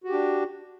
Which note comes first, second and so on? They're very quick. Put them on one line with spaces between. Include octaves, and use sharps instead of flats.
F#4 G4 D4